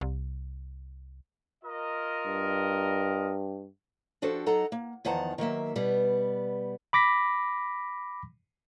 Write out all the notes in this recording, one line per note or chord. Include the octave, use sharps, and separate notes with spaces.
C2
F4 A#4 D#5
G2
F3 D4 F#4 G4 A4 C5
F#3 D#4 A4 D#5 F#5 A#5
A#3
E2 D#3 F3 F#5 A5 A#5
D#3 F#3 A#3 E5
B2 G3 B3
B5 D6 A#6 B6